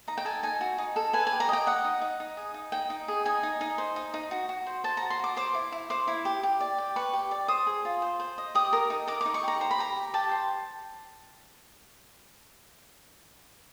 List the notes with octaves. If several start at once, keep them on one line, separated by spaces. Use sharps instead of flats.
D#4 A#5
G5
A4 G#5
D#4 G#5
F#4
D#4
A4
B4 G#5
G#5
G4
A#5
D#5 G5
D#5 F#5
D#4
D#4
D#4
G#4
D#4
D#4 G5
D#4
G#4
D#4 G#5
D#4
D#4
C5
D#4
D#4
F#4
F#4
C5
C5 A5
A#5
F#4
C6
F#4 D6
C5 D6
E4
E4
C5 D6
E4
G4
G4
D5
G4
B4 C#6
G4
D5
C5 D#6
G#4
F4
C5
C5
D#5
G4 D#6
A#4
D#4
A#4 D6
D6
D#4
C#6
G4 A#5
C5 A#5
B5
G4 A#5
G4
G4 A5
C5